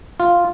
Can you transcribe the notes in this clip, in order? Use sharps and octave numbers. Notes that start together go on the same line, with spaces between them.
F4